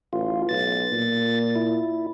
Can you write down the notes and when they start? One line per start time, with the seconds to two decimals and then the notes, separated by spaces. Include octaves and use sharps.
0.13 A1 F4
0.49 B1 A6
0.92 A#2
1.56 E4